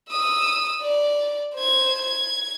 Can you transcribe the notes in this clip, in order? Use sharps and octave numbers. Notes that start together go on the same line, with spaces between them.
D#6 E6
D5
C5 G#6
G#6